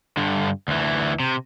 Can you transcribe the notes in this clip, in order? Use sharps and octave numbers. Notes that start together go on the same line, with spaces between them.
G2 D3
D2 E3
C3